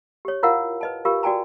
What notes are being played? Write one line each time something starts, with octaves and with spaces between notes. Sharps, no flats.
G4 C#5
E4 F4 A#4 F5 F#5
B4 D#5 A5
F4 G4 A#4 F5
F#4 D5 G5 G#5 A#5